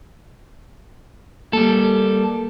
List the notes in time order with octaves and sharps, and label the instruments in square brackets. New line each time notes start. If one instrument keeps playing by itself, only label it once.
[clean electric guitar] G3 A4 [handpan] A#3